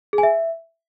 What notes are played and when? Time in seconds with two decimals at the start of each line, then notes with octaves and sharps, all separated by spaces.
0.13 G#4
0.18 G#5
0.23 E5